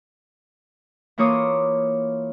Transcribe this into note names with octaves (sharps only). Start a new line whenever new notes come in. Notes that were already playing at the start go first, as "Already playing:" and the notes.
E3 A#3 F4 C#5 D6 D#6